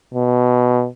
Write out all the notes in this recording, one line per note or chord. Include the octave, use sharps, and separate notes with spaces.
B2